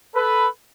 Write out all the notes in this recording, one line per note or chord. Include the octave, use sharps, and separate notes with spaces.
A4 B4